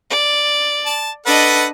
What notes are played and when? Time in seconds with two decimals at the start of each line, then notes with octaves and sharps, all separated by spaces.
0.10 D5
0.86 A5
1.26 D4 A4 B4 D#5 F#5